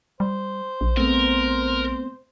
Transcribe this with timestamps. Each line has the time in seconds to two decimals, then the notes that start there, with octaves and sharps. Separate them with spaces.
0.20 G3 C5
0.81 A#1
0.97 A3 B3 C4 A#4